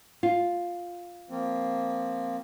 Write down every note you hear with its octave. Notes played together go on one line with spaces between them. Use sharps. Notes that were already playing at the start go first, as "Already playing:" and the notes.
F4
F3 A#3 C4